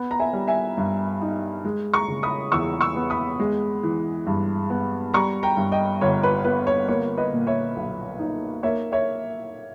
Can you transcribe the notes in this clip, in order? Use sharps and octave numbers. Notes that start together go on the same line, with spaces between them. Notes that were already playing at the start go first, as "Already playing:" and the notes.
Already playing: B3
A#5
E5 G#5
G3
E5 G#5
G2
D#4
G#3
A#5 C#6
C#3
B5 D#6
E2 C#6 E6
C#6 E6
B3
B5 D#6
G#3
E3
G2
B3
G3 A#5 C#6
G5 A#5
G2
D#5 G5
G1 C#5
B4
B3 B4
C#5
A#3 C#5
B4 D#5
A#2
C#5 E5
B1
D#4
A#3 C#5 E5
C#5 E5